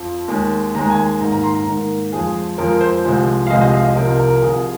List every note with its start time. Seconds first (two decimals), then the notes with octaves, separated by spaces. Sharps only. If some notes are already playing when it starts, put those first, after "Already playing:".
Already playing: F2 F3
0.28 D#2 D#3 G#3
0.74 D#2 D#3 G#3 A#5
0.90 G#5
1.20 G#2 D#3 A#3 A#5
1.32 A#5
1.43 C6
1.55 A#5
1.66 G#2 D#3 A#3
2.12 F2 F3 G#3 G#4
2.58 F2 F3 G#3 A#4
2.81 C5
3.05 C2 C3 F3 G#3
3.47 F5
3.50 C2 C3 F3 G#3 D#5
3.61 D#5
3.73 F5
3.85 D#5
3.96 C2 C3 F3 A#4
4.19 A#4
4.42 C2 C3 F3 G#4